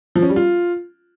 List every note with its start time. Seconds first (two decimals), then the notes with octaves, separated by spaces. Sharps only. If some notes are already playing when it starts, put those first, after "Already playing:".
0.15 F3
0.22 C#4
0.29 G3
0.36 F4